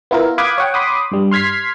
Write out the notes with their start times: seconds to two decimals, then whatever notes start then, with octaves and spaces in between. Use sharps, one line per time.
0.11 B3 E4 F4 A#4
0.38 F5 B5 D6 D#6 F#6 G#6
0.58 C#5 F#5 G5
0.74 B5 C6 D6 D#6
1.12 G2 G3
1.31 C6 F6 G#6 B6 C7